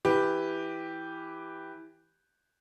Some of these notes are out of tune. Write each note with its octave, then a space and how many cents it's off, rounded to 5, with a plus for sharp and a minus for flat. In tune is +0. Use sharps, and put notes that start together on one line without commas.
E3 -5 G4 +0 B4 +0